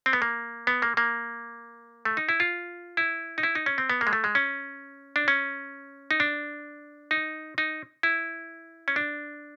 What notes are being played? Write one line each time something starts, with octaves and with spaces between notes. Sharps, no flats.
C4
B3
A#3
B3
A#3
A#3
A3
D#4
E4
F4
E4
D#4
E4
D#4
C#4
C4
B3
A#3
G#3
A3
G#3
C#4
D4
C#4
D#4
D4
D#4
D#4
E4
C#4
D4